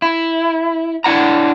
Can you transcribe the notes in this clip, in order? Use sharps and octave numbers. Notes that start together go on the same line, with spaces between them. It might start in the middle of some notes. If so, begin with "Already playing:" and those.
E4
D4 E4 F#5 A#5